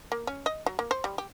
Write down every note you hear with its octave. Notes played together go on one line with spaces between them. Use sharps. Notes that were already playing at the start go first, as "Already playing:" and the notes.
A#3
C#4
D#5
F#3
A#3
C5
G3
G4